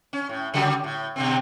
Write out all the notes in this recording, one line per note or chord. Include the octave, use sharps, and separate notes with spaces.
C#4
A2
C#3 F#3 G3
A2
B2 D3 C4